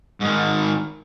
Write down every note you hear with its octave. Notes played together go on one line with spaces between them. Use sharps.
G#2 D#3